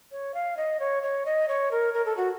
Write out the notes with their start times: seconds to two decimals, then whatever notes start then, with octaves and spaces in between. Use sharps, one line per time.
0.12 C#5
0.34 F5
0.57 D#5
0.80 C#5
1.03 C#5
1.25 D#5
1.48 C#5
1.71 A#4
1.94 A#4
2.06 A4
2.17 F#4